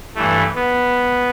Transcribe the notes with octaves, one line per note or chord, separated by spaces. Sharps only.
G2 E3 A3
B3